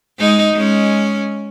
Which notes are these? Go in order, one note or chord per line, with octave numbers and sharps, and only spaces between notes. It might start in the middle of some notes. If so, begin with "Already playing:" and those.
G#3 D#4
G#3 C#4